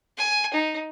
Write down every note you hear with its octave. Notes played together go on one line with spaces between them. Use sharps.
G#5
D#4